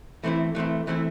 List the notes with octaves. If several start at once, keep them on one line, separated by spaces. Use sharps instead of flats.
E3 A3 C4 E4
E3 A3 C4 E4
E3 A3 C4 E4